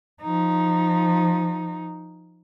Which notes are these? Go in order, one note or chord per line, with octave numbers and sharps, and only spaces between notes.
F3 D#4